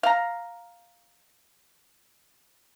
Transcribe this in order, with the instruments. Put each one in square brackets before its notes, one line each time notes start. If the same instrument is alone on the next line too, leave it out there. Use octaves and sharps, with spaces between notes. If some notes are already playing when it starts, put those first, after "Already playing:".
[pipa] F5 A#5